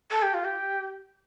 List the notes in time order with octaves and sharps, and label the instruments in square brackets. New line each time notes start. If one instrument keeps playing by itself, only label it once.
[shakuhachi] A4
G4
F4
G4